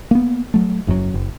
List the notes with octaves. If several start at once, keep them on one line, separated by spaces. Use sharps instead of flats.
A#3 B3
F#3 A3
F#1 F#2 B2 F#3
F#1